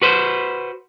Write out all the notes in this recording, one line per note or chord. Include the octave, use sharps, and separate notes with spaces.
F#4 B4 C5